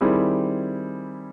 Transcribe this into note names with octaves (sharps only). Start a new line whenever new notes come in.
D#3 G3 C4 E4 G#4